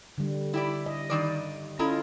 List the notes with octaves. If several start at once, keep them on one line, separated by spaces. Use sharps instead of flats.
D3 G3
E4 G4 D5
D#5
G2 D#3 D5
C#4 E4 F4 A4 D#5 A#5